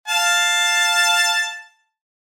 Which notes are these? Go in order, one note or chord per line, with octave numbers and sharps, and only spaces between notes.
F5 A5